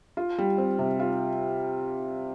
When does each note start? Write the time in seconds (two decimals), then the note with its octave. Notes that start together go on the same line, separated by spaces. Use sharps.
0.17 F4
0.38 G3
0.58 C4
0.79 C3
1.00 F4